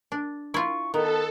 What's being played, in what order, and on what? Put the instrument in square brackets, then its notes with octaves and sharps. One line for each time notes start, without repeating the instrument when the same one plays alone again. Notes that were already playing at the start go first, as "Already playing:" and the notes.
[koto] D4
[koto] E4 F4 [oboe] C#6
[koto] D#3 [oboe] B3 [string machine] A4